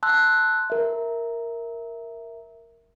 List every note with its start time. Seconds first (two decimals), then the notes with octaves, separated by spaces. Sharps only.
0.03 A5 C6 E6 F#6
0.70 A#4 E5